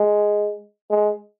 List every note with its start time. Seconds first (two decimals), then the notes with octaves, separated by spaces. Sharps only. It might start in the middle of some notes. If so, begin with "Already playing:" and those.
Already playing: G#3
0.90 G#3